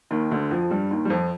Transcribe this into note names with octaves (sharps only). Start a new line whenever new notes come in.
D#2 D#3
D2 D3
F2 F3
G2 G3
D#2 D#3
G3
F2 F3